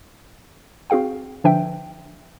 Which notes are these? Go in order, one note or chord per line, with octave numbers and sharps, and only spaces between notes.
C4 F#4 G#4 F5 G5
D3 F3 D4 B4 E5 G5